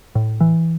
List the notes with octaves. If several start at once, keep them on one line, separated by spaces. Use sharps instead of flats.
A2
E3